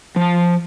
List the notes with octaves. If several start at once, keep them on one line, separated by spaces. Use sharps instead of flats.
F3